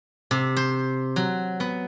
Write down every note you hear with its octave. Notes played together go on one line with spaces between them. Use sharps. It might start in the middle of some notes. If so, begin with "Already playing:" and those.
C3
C5
F#3
B3